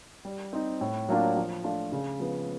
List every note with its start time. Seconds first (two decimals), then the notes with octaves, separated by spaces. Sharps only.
0.25 G3
0.53 C4 D#4
0.81 A2
1.09 F#3 A#3 D4 F4
1.37 F3
1.64 A3 D4 F4
1.92 C#3
2.20 F3 G#3 B3